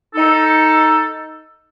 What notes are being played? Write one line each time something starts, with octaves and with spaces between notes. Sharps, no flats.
D#4 A4